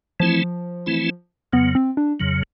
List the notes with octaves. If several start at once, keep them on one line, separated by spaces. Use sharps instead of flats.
E3 F3 A3 C4 E4
E3 A3 C4 E4
F2 C#3 F#3 B3
C4
D4
F2 C#3 F#3